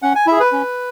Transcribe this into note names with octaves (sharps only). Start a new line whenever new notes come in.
C#4 F#5
G#5
E4 G#4 E5
B4
C#4